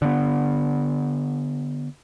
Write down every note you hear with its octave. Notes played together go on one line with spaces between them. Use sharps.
D3 B3